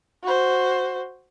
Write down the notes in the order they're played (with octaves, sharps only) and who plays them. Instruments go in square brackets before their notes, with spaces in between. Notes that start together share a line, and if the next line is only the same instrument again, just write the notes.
[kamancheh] F#4 C5